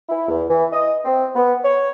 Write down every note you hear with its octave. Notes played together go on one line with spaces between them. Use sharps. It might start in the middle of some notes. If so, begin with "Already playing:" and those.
E4
E2
E3
D#5
C4
B3
C#5